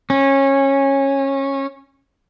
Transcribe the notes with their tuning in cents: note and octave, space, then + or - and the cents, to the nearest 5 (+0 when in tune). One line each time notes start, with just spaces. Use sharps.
C#4 -20